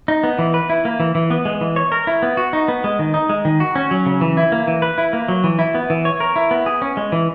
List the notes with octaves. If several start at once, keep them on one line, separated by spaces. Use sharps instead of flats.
D#4
B3
E3
B4
E4
A#3
E3
E3
B3
G#3
E3
C#5
A#4
E4
B3
F#4
D#4
B3
G#3
D#3
D#4
G#3
D#3
F#4
C#4
F#3
C#3
E3
E4
A#3
E3
B4
E4
A#3
F#3
E3
E4
B3
E3
C#5
A#4
E4
B3
G#4
C#4
G#3
E3